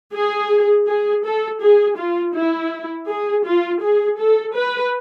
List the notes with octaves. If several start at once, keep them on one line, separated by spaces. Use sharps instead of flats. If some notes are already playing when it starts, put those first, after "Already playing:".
G#4
G#4
A4
G#4
F4
E4
G#4
F4
G#4
A4
B4